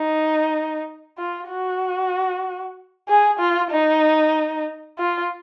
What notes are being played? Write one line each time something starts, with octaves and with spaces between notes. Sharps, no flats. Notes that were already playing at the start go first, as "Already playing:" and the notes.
Already playing: D#4
F4
F#4
G#4
F4
D#4
F4